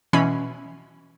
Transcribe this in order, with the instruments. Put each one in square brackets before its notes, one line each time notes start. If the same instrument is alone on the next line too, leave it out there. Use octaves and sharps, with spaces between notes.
[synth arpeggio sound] B2 E3 C#4 B5 C7